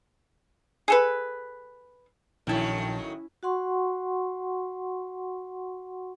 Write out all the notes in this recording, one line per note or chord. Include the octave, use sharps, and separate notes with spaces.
G#4 A4 B4
A#1 A2 D#3 F#3 C#4 E4 G5 A5
F#4 F#5 C6 C#6